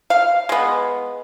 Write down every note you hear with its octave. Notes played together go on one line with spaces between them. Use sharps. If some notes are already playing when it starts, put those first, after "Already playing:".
F5
G#3 B3